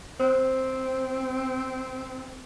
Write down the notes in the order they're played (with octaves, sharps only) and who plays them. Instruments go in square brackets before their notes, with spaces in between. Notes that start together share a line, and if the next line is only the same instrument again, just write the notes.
[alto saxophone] C4 [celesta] C5